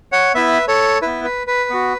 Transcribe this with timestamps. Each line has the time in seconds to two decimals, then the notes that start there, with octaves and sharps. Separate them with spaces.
0.12 C#5 F#5
0.35 B3 E4 B4 E5
0.68 A4 C#5
1.02 B3 E4 B4
1.25 B4
1.47 B4
1.70 B3 F#4